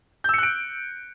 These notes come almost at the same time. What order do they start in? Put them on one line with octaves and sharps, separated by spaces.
G6 E6 C#7 F#6 D7